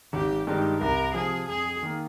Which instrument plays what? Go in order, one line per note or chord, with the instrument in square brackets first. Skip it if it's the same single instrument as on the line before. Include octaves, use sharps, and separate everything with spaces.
[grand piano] G#1 [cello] G4
[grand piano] G2 D#3 G#3 D#4 [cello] G4
[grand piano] C2 [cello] A#4
[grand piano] C3 F3 [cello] G#4
[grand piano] F2 [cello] G#4
[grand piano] D#3 A#3